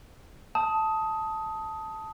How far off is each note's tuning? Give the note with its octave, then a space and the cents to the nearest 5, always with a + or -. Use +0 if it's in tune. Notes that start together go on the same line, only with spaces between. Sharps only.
A5 +0 D#6 +15